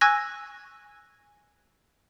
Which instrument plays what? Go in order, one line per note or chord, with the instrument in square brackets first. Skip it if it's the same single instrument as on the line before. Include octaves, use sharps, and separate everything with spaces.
[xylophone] G#5 C#6 E6 F#6 G#6 A#6